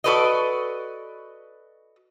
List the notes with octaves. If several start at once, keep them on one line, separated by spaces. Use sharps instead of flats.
F#4 A4 B4 D5 D#5